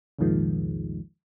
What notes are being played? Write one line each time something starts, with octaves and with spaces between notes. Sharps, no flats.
C2 F2 A#2 D#3 F3 G#3